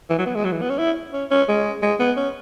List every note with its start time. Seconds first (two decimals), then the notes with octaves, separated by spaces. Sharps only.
0.10 E3
0.18 F#3
0.26 B3
0.35 G#3
0.45 F#3
0.52 E3
0.62 B3
0.70 C#4
0.79 E4
1.13 C#4
1.31 C#4
1.48 G#3
1.82 G#3
2.00 B3
2.17 C#4